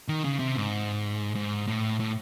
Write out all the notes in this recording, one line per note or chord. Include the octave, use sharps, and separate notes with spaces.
D#3
C#3
C3
G#2
G#2
A2
A2